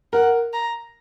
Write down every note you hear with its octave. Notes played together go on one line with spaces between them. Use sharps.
A#4 F#5
A#5